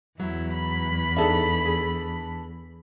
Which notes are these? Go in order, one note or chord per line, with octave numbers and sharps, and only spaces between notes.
E2 F#3 E4
B5
D4 D#4 G#4 A4 E5
G#4